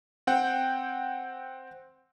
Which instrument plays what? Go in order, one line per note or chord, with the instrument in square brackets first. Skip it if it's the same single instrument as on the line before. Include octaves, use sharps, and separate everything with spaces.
[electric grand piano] C4 F#5 G5